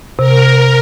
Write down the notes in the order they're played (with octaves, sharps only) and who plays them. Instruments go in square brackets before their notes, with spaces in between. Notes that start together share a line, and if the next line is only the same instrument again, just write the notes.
[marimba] C3 [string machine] A#4